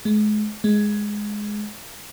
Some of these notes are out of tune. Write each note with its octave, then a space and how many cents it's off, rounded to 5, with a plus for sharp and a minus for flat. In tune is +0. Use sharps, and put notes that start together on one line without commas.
G#3 +35
G#3 +5